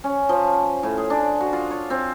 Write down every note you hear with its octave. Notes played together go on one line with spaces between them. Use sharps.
C#4
F3
A2
G#4
D4
F#4
F4
C#5
C4